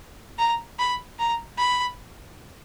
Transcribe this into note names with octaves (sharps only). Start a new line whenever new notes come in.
A#5
B5
A#5
B5